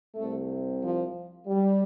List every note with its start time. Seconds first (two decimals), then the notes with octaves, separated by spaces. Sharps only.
0.15 C2 C3 A3
0.81 F3
1.48 G3